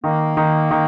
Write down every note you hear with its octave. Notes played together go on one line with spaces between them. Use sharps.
D#3 A#3
D#3
D#3